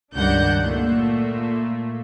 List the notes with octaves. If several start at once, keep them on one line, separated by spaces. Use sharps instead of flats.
C#2 G2 D#3 D4 F#5 G6
A#2 A3